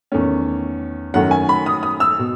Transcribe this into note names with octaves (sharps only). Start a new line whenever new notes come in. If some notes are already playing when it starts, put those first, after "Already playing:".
E2 D#3 A3 C#4
F#2 D#3 A3 C#4 F#5
G#5
B5
D#6
D#6
E6
B2